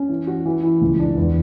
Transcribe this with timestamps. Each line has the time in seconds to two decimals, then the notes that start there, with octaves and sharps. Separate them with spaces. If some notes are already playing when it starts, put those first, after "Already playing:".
Already playing: C#4
0.09 E3
0.27 F#4
0.46 E3
0.63 E4
0.81 C#2
0.99 D4
1.17 E2